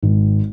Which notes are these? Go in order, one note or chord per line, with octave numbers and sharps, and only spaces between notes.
G#1